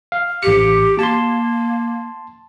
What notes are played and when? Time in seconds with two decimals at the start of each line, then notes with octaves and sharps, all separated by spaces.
0.12 F5
0.43 A1 G4 C#7
0.99 A#3 A5 C6